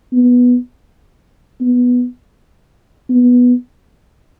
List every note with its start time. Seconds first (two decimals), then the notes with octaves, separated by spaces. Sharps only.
0.13 B3
1.61 B3
3.09 B3